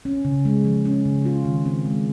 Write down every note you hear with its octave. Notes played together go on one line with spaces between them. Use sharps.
C#4
C#3
G#3
F3
C#4
C#3
F4
D#3
C4
G#3